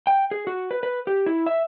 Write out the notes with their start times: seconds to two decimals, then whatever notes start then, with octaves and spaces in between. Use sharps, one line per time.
0.07 G5
0.31 G#4
0.47 F#4
0.71 B4
0.83 B4
1.07 G4
1.26 E4
1.46 E5